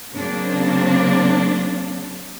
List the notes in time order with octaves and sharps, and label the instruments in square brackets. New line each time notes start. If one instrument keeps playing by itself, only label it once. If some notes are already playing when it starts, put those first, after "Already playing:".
[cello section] C#3 F#3 A#3 C4 D4